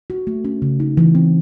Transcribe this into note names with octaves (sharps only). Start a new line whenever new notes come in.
F#4
A3
C#4
C#3
D#4
E3
C4